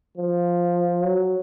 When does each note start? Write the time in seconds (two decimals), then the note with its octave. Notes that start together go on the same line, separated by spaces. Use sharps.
0.18 F3
1.04 F#3